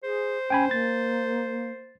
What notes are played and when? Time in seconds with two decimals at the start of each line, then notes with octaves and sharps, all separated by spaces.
0.03 G#4 C5
0.50 C#4 G5 G#5 B5
0.71 A#3 A6